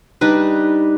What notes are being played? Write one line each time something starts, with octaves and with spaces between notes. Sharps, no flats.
G3 D4 D#4 B4